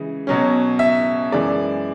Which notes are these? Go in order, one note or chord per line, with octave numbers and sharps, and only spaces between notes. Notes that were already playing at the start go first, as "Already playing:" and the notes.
Already playing: C#3 E3 G#3
B2 F#3 C#4
E5
F#2 E3 G#3 D5